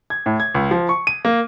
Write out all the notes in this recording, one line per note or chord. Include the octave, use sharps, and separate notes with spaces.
G#6
A2
G#6
C#2
F3
C#6
D#7
A#3